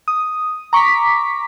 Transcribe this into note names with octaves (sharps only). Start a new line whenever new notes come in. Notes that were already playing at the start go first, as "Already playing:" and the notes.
D#6
A#5 C#6 D6 B6